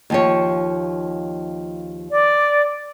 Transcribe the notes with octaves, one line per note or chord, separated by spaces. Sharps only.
D#2 F3 C#5
D5